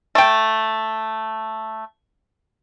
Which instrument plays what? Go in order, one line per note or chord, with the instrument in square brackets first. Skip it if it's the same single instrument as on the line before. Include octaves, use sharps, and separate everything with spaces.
[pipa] A3 G5